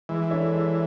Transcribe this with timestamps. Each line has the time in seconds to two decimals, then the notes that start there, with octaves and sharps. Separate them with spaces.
0.09 E3 G#3
0.31 D4 A4 C#5 E5
0.52 G#3